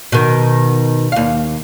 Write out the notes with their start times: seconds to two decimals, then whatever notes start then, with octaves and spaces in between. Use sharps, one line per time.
0.12 B2 D#3
1.12 D#2 F5